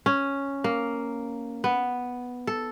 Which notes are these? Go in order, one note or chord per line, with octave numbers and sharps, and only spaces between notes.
C#4
A#3
B3
A4